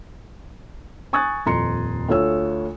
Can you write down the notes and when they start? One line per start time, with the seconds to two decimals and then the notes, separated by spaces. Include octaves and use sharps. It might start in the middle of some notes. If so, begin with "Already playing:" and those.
1.13 G#5 C#6 D#6 F#6 G#6 A6
1.46 D#1 F2 A#5 C6 C#7
2.08 D2 A3 F4 C#5 E6